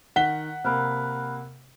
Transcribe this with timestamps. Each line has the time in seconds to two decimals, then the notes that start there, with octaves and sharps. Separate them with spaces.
0.16 D#3 F#5 B6 G7
0.64 C3 A#3 B5 F6 F#6